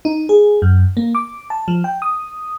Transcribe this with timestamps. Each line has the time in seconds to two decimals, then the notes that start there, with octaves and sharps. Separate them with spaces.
0.05 D#4
0.29 G#4
0.62 F#2
0.97 A#3
1.15 D6
1.50 A5
1.68 F3
1.84 G5
2.02 D#6